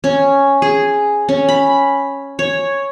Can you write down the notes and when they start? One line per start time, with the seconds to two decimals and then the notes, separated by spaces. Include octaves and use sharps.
0.04 C#4
0.62 G#4
1.29 C#4
1.49 B5
2.39 C#5